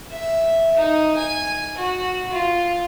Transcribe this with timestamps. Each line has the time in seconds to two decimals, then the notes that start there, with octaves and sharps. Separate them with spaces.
0.11 E5
0.76 D#4
1.16 G#5
1.77 F#4
2.32 F4